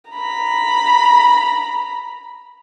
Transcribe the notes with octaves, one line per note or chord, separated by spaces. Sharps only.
A#5 B5